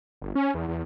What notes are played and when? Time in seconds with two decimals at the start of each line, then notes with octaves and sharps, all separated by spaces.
0.22 G1
0.35 C#4
0.54 E2
0.68 E2